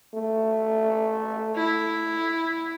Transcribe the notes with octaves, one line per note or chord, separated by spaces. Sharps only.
A3
E4